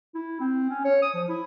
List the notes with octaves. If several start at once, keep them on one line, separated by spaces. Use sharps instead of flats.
E4
C4
C#4
C#5
D#6
F3
E4